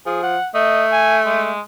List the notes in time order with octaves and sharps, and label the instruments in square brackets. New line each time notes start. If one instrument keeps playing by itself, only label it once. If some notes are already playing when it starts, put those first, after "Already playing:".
[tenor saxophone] F3 [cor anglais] G#4
[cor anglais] F#5
[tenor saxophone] A3 [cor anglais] D#5
[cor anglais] G#5
G#3